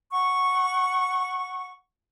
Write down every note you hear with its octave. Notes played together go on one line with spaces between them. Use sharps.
F#5 C#6